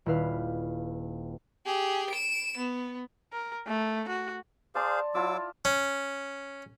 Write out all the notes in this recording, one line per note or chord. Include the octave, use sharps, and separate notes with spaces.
D#1 E4 B4 F5
G4 G#4
D7 E7
B3
A#4
A3
F#4
G#4 C5 D5 F5 A5 C6
F#3 E4 F4 A5 D6 E6
C#4